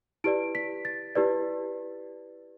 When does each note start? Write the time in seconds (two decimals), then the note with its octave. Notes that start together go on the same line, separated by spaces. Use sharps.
0.24 E4 G4 B4 D5 D7
0.55 B6
0.85 A6
1.15 E4 G4 B4 D5